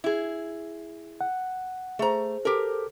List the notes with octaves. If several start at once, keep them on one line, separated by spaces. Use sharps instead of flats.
E4 G#4
F#5
A3 G#4 C5 A#5
G4 A4 A#4